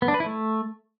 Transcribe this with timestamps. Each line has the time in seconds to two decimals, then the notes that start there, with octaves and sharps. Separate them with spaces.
0.02 B3
0.08 D4
0.14 B4
0.20 E4
0.26 A3